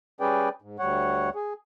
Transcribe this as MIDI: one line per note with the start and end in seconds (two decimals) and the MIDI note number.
0.21 0.49 55
0.21 0.49 61
0.21 0.49 68
0.21 0.49 71
0.21 0.49 74
0.21 0.49 79
0.62 0.77 44
0.79 1.30 38
0.79 1.30 55
0.79 1.30 73
0.79 1.30 78
1.35 1.53 68